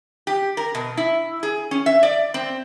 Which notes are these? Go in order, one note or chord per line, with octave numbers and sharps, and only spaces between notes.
G4
A#4
B2
E4
G#4
C#4
E5
D5
C4